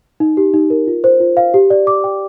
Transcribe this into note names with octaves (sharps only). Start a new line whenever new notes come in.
D#4
G4
D#4
A#4
F4
C5
F4
F5
G4
D5
D6
G5